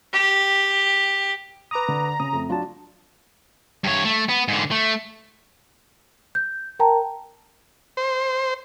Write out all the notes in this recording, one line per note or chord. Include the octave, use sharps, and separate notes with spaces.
G4
B4 A#5 D6 D#6
D3
C#3 D#6
F2 A3
F#3 D4 F4 A5
G2 C#5
A3
B3
G#2 D3
A3
G6
A#4 G5 A5 A#5
C5